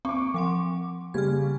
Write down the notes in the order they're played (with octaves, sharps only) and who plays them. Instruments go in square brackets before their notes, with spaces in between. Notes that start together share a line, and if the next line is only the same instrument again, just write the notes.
[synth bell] C4 [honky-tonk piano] C#6 D6
[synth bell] F3 F#5 C6
[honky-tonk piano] C#3 G3 [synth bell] F6 G#6